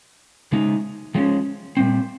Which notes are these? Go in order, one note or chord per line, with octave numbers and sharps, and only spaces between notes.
C#3 G#3 D#4
F3 G#3 C#4
A#2 G3 C4